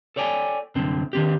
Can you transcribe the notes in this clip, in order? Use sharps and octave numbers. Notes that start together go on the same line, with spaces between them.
A4 C#5 D5 G5 G#5
C2 F#2 D3 C4
D#3 C4 G4